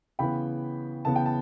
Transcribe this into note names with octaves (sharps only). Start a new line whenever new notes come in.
C#3 E3 B3 G5 B5
C#3 E3 B3 A5
G5
A5